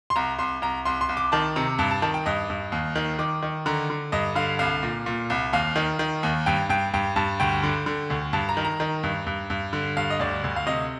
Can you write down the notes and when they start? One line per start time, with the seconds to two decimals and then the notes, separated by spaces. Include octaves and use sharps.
0.10 C6
0.16 C2 A#5
0.39 C2 C6
0.62 C2 A#5
0.85 C2 C6
1.01 C6
1.09 C2
1.17 D6
1.32 D#3 A5
1.56 C3 A#5
1.79 G2 A5
1.91 A5
2.02 D#3 A5
2.14 G5
2.26 G2 D#5
2.50 G2
2.72 D#2
2.95 D#3
3.19 D#3 D6
3.43 D#3
3.66 D3 A#5
3.90 D3
4.12 G2 D#5
4.35 D3 F5
4.59 C2 F5
4.83 A#2
5.06 A#2
5.30 C2
5.53 D#2 F5
5.76 D#3
5.99 D#3
6.23 D#2
6.46 G2 G5
6.69 G2 G5
6.94 G2 G5
7.16 G2 A5
7.40 D2 G5
7.63 D3
7.86 D3
8.10 D2
8.33 G2 A5
8.49 A#5
8.57 D#3
8.65 A#5
8.80 D#3
9.03 G2
9.27 G2
9.50 G2
9.73 D3
9.97 G2 F5
10.10 D#5
10.20 D2 D5
10.44 D2
10.56 F5
10.66 C3 D#5